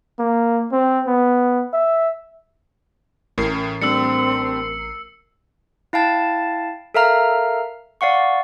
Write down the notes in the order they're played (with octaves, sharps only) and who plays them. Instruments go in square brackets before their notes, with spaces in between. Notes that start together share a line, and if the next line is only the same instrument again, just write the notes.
[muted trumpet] A#3
C4
B3
E5
[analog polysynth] A1 A#4 C7 [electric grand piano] A2 C#4
[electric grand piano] G3 A3 D4 [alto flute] C4 [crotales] E6 C#7
[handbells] E4 F5 G5 A5 A6
A4 A#4 E5 F5 A#5 F6
D5 F5 F#5 C#6